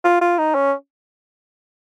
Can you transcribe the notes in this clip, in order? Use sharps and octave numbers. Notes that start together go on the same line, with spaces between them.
F4
F4
D#4
C#4